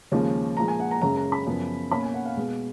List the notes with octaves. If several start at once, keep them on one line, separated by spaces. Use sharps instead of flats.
D#2 C#3 F3 G#3 C#4
A#2 F3 G#3 A#5
G#5
F#5
A#5
F#2 C#3 G#3 C#4 A#5
A#5
B5
F#2 C#3 F3 B3
B2 A#3 C#4 B5
G#5
F#5
F5
B2 G#3 B3